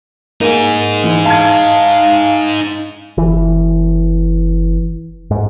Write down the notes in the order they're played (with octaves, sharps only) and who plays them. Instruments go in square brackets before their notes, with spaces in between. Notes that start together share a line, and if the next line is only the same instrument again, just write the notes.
[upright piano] A#3 [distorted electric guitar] D#4 G#4
[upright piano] E3
[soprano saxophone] F5 [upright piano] A5 G#6
[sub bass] F#1 [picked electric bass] E3
[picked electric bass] G#2